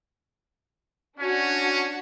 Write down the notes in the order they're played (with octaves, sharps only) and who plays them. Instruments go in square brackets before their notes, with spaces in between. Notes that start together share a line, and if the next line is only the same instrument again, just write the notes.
[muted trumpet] C#4 [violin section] D4 F#4